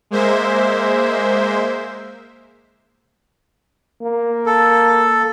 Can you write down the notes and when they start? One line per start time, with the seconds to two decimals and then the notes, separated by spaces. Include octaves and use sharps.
0.11 G#3 A#3 C5 E5
4.02 A#3
4.46 A4